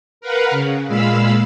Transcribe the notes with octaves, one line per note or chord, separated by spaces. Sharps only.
A#4 B4 F5 F#5
C#3
A#2 G#3 F5 B5 E6